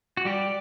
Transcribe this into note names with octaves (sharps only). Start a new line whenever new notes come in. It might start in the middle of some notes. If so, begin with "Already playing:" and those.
F#4
G3 G4 D5